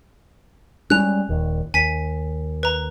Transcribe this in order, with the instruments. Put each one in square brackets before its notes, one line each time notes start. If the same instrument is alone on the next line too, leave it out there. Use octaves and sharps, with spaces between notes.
[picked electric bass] G3 G#3 C#4 [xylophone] F#6 F7
[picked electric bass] D#1 D#2
[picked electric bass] D#2 [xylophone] G#5 B6
[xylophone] B4 A#5